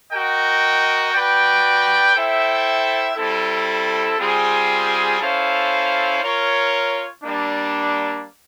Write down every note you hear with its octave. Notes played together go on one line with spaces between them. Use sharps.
F#4 A#4 D#5 G5
F#4 B4 D5 G5
E4 A4 C5 E5 G5
G3 C4 E4 A4
G3 C4 F4 G#4
C#4 E4 A4 C5 F5
F4 A#4 C#5
G3 A#3 D4